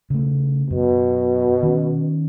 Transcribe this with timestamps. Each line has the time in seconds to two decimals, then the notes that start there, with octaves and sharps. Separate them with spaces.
0.10 C#3 A3
0.70 F#2 B2
1.63 D#3 C#4